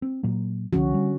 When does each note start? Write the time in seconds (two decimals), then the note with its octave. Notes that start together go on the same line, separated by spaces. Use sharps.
0.02 C4
0.23 A#2 F#3 A#3
0.73 C2 D3 F3 C#4 F#4
0.94 G3